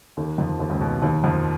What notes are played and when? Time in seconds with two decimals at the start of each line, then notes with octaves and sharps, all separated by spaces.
0.17 D#2 D#3
0.38 F2 F3
0.59 D#2 D#3
0.70 C#2 C#3
0.81 B2
1.02 D#2 D#3
1.24 F2 F3